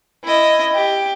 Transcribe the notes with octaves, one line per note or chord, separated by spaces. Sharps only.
E4 D#5
G4